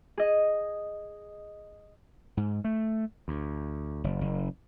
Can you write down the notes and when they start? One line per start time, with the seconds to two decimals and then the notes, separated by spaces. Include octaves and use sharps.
0.18 G#4 D#5
2.37 G#2
2.64 A3
3.28 D2
4.04 F#1
4.21 F#1